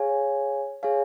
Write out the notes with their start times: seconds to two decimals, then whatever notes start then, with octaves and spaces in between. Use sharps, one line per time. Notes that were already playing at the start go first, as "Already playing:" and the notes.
Already playing: G#4 C#5 F5 G#5
0.83 G#4 C#5 F5 G#5